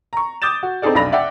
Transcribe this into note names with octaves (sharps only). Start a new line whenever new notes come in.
A#5 C#6
D6 D#6 G6 A6 E7
F#4
C4 D#4 G#4 A4 D5
F1 B1 D4 B5 A#6 F7
D5 E5 F#5 G5